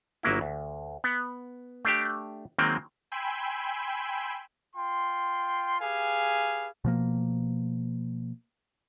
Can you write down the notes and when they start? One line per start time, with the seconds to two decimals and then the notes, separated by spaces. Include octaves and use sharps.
0.23 G1 F#3 A#3 E4
0.41 D2
1.04 B3
1.85 A3 D4 G4
2.58 D#3 F#3 G#3 A#3 C4
3.12 G5 G#5 B5 C6 E6
4.76 F4 G5 C6
5.81 G4 G#4 B4 F5 G#5
6.85 B2 F3 A#3